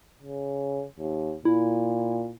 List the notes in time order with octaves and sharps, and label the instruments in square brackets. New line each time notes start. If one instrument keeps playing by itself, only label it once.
[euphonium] C#3
D#2
[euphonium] A#2 [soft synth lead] E4